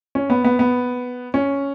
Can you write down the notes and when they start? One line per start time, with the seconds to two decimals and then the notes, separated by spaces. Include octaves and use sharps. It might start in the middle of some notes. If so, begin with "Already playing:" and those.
0.15 C#4
0.30 B3
0.44 B3
0.59 B3
1.34 C#4